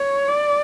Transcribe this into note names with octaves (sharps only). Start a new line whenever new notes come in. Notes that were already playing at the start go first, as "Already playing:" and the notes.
Already playing: C#5
D5